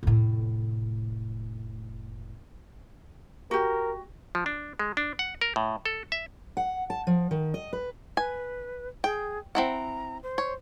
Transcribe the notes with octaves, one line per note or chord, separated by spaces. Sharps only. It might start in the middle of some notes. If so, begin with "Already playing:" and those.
F1 A2
F#4 G4 A#4
F3
D4
G#3
D4
F#5
A#4
A2
A4
E5
F#5
A5
F3
D#3
D#5
B4
B4 G#5
G#4 G5
C4 E4 F#5 A#5
C5
C#5